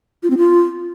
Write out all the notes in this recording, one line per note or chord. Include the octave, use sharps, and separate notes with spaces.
F4
C4
F4